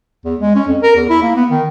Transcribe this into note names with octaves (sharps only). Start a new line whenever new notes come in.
E2
G#3
C#4
F2
A#4
E2
E4
A#3
B3
D#3